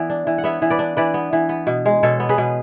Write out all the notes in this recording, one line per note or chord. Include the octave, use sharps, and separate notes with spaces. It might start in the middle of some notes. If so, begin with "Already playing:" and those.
Already playing: E3 B3 D5
D4
E3
F#5
B3 C#5 E5
E3
B4 D5
D4
E3 B4 D5
B3
E3
B3
B2
G#3
B2 A4 C#5
B3
G#4 B4
B2